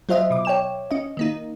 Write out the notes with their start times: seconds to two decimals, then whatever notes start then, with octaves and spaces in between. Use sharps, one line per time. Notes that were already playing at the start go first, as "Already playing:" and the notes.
0.09 F#3 F4 C5 D#5 E5
0.30 B2 D6
0.45 C#5 G5 E7
0.91 C#4 D#5
1.17 D#3 A#3 D#4